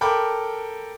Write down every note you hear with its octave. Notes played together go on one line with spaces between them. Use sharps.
A4 A#4 G5 B5 D6